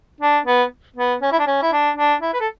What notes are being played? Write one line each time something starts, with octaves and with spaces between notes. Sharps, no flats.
D4
B3
B3
C#4
E4
D4
C#4
E4
D4
D4
E4
B4
A4